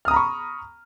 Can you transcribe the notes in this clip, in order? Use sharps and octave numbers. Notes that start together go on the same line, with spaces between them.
A#5 B5 C#6 D#6 F6